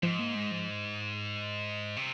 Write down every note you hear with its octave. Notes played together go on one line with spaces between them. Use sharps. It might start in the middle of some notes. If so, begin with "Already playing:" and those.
G#2 F3
A#3
G#3
F3
C3